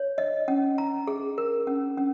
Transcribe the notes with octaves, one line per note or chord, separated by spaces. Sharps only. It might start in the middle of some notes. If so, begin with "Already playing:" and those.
Already playing: C#5
D#5
C#4
A#5
G#4
A#4
C#4
C#4